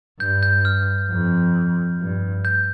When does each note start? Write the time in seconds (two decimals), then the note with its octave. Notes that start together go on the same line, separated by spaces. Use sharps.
0.20 G2 G6
0.43 G6
0.65 F6
1.10 F2
2.00 G2
2.45 G6